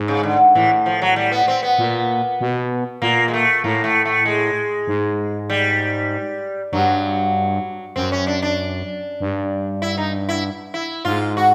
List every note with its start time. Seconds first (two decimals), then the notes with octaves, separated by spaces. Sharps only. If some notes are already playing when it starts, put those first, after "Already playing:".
Already playing: G#2
0.08 C#3
0.23 D3
0.55 A2 E3
0.86 F3
1.02 F#3
1.16 G3
1.32 B3
1.48 C4
1.63 B3
1.78 A#2
2.41 B2
3.02 A#2 A#3
3.28 G#3
3.33 A3
3.64 A2 A#3
3.84 A3
4.05 A3
4.25 G#3
4.87 G#2
5.50 G3
6.73 G2 F#3
7.96 F#2 C4
8.12 C#4
8.27 D4
8.42 D4
9.20 G2
9.82 E4
9.98 D#4
10.29 E4
10.74 E4
11.05 G#2 F4
11.37 F#4